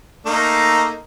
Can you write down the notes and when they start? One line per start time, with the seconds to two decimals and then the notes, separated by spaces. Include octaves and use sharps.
0.26 A3 A#3 D#4